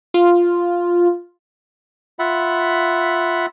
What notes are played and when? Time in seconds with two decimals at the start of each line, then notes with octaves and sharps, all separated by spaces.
0.14 F4
2.19 F4 E5 F#5 B5